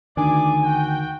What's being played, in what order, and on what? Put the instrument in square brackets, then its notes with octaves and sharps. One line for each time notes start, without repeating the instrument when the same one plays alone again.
[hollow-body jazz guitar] D2 G#2 D4 [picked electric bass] D#3 [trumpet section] G#4 D5 D6 [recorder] G#5
[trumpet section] F#4 G5